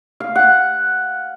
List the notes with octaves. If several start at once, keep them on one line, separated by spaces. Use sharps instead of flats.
F5
F#5